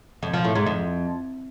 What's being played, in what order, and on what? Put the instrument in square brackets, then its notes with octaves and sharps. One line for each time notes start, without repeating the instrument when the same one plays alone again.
[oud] F2
F3
A2
G#2
F2